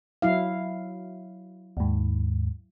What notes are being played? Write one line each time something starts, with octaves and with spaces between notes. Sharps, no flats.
F#3 E4 F5
D#2 G#2